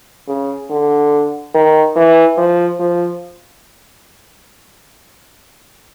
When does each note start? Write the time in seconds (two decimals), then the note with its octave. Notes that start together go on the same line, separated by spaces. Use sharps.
0.28 C#3
0.71 D3
1.55 D#3
1.96 E3
2.38 F3
2.80 F3